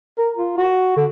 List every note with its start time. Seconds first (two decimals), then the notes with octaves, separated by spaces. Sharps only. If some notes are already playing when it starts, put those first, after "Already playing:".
0.18 A#4
0.37 F4
0.58 F#4
0.97 D3